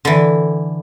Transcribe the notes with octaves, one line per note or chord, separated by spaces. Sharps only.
D3 E3